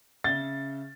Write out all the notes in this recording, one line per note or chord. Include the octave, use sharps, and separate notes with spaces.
C#3 E5 A6 G7